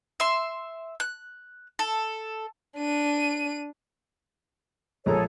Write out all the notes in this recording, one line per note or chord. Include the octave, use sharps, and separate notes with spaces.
E5 C6
F#6
A4
D4 D#7
A#1 G#3 G#4 A4 C#5 A#5